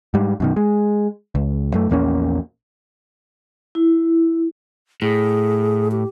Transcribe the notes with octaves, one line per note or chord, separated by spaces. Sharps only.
G#2 G3
F#2 B2 D#3
G#3
C#2
F#2 A3
A#1 E2 A#3 C#4
E4
A2 G#4
G4